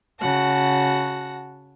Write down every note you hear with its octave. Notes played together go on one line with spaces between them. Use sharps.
C#3 F#4 F#5 A5 A#6